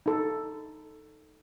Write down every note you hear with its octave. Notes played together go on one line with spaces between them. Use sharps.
D#4 A4